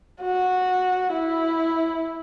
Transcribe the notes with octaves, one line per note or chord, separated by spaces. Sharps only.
F#4
E4